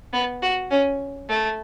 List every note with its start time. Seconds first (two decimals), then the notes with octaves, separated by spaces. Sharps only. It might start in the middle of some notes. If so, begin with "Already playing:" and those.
0.13 B3
0.42 F#4
0.71 C#4
1.29 A3